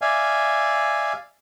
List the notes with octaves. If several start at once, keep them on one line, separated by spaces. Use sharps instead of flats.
D5 E5 F5 G#5